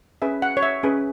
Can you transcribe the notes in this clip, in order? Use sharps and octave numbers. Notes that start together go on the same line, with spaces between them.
C#4 G#4 B4 E5
F#5
C#5
E5
C#4 G#4 B4